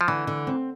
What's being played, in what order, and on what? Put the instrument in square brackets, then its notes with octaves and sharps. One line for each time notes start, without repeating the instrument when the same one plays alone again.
[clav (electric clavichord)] F3
[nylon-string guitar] D3 [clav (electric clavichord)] E3
[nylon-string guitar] D3
C4